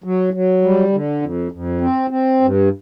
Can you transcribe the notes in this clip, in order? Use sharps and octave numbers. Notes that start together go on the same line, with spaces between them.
F#3
F#3
G3
D3
F2
F2
C4
C4
G2